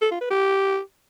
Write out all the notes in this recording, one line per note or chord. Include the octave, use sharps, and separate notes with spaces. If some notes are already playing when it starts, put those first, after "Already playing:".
A4
F4
B4
G4